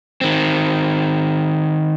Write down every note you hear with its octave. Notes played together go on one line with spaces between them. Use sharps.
D#3 C4